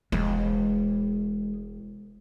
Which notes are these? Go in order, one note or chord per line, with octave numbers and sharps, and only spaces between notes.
E1 G#3